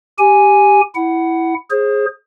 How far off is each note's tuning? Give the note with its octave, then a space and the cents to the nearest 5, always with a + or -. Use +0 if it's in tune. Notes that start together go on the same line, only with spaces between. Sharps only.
G4 +0 G#5 +0
E4 +0 F#5 +15
G#4 +0 C5 +35